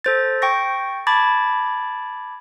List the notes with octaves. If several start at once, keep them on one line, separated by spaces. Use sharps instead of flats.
A4 C5 A6
G5 C#6 A#6
A5 B5 D6 G#6 A6